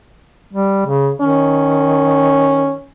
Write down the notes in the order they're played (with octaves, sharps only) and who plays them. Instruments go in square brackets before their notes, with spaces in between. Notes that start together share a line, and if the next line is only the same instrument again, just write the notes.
[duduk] G3
C#3
[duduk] D#3 [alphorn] C#4